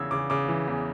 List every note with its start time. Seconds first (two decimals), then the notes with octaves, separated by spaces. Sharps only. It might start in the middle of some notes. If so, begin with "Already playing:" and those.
Already playing: E2 C#3 E3 E6 G#6
0.11 C#3 D6
0.30 C#3 D6
0.48 E3
0.68 E2